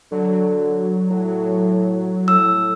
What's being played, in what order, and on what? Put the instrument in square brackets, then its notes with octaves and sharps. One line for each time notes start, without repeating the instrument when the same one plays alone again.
[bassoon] D3 [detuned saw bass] F#3
[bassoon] A2
[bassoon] A2 [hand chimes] E6